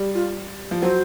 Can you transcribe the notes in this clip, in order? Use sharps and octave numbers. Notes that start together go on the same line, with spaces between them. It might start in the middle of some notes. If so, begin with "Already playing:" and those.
Already playing: G3
F4
F3
F#3 C5